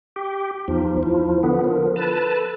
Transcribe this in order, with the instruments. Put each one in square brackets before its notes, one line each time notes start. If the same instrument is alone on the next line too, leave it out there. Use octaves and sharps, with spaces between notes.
[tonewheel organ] G4
[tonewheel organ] E2 F3 [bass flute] D#4
[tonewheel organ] F3 [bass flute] E4
[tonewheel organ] D3 B3
[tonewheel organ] F3 [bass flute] A#4
[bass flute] A4 [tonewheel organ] B4 A5